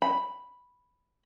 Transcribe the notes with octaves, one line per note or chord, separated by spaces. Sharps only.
B5